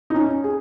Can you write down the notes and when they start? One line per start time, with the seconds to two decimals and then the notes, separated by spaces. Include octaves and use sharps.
0.10 D#4
0.14 C#4
0.29 C#4
0.44 G#4